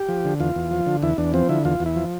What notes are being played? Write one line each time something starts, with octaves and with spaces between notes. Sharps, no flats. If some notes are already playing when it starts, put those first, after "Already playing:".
Already playing: G4
F3
D3
E2 F4
E2
F3
D3
E2 E4
E2 D4
F3 C4
D3 E4
E2 F4
E2
E4
F3